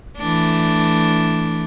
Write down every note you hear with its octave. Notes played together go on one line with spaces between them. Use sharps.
E3 A3 D4